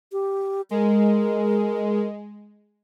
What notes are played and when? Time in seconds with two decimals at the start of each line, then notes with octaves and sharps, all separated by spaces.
0.12 G4
0.71 G#3 A#4